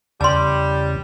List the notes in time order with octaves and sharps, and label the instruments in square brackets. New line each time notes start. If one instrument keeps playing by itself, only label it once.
[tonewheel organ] E2 C#3 [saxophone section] G3 [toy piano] A5 C6